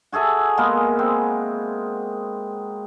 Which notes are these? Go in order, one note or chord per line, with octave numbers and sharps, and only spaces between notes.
F#4 G#4 A4 E5
G#3 A#3 B3 A#4
C4